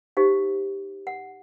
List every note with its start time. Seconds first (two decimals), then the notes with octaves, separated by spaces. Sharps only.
0.17 D#4 G4 C5 F5
1.07 F#5